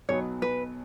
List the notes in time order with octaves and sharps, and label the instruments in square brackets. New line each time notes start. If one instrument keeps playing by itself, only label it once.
[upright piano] B1 B2 F#3 B3 D#4 [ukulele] C#5
[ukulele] B4